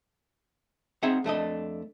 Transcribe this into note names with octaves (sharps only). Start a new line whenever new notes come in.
C4 D#4 G#4 E5 F#5
F2 A3 D4 D#5